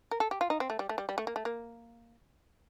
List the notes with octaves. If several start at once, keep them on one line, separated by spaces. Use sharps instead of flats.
A#4
A4
G4
F4
D#4
C4
A3
G3
A3
G3
G3
A3
A#3
A3
A#3